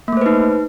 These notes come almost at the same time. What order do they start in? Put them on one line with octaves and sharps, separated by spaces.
A#3 A3 C5 B4 D#4